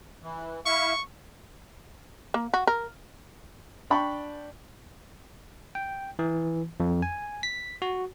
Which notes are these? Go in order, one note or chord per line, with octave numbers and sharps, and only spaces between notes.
E3
E4 E5 F5 C#6
A#3
F#4
A#4
D4 D5 G5 A5 B5 C#6
G5
E3
F2
G#5
B6
F#4